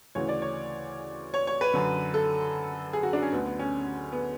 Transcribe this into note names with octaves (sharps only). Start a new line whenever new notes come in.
D2 C#3 E3 C#5
D5
C#5
C#5
C#5
B4
F#2 D3
A4
G#4
F#4
D4
C#4
D2 D3 B3
B3
C#4
B3